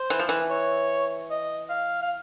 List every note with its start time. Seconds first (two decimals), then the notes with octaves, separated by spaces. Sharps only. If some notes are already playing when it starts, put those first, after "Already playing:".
Already playing: C5
0.10 E3
0.19 F3
0.29 E3
0.51 C#5
1.31 D#5
1.69 F5
2.02 F5